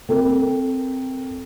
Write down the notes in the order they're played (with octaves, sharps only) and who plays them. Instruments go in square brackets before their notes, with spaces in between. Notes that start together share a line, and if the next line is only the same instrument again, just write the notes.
[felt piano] C4 A4 A#4